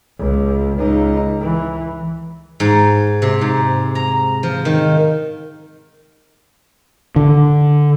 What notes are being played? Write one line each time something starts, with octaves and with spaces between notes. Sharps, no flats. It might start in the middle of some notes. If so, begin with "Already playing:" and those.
C#2
C#2 D#4
E3
G#2
C3
G#2
A#5
F3
D#3
D3